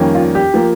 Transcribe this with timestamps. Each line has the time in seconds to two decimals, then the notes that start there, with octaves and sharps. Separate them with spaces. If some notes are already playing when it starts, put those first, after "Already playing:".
Already playing: F2 D#3 G3 A#3 C#4
0.15 F4
0.35 G4
0.54 F3 A#3